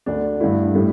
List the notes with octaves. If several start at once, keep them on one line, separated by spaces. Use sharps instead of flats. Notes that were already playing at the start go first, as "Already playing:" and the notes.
D2 D3 A3 D4
G2 D3 A3 E4
A2 G3